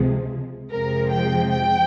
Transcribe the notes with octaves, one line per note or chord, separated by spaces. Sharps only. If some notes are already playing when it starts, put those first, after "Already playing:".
Already playing: C#2 C3 F3 G#3
F2 C3 F3 G#3 A#4
G5
G5